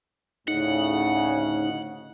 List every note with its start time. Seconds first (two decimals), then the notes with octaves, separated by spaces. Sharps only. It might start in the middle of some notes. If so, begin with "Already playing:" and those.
0.48 D2 A2 C#3 D#4 F#5